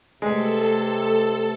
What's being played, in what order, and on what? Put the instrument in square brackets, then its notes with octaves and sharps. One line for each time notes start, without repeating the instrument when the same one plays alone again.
[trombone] C3 [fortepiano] G#3 [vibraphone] A3 B4 D5 [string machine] A4